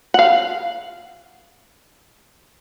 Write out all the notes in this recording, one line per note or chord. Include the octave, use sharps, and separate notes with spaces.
F5 F#5